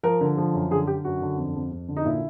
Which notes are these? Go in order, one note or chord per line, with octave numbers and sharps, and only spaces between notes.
F3 A#4
D3
F3
F#2
D3 G#4
D3 G4
F#2 F#4
D3
F2
F2
F2
D3
D#4
A#2 E4